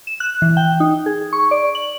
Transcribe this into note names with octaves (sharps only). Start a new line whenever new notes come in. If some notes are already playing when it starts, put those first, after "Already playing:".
E7
F#6
E3
G5
D#4
G#4
C#6
D5
F#7